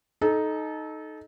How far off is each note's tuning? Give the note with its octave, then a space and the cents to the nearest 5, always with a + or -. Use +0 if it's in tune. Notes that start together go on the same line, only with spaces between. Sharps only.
D#4 +0 A4 -25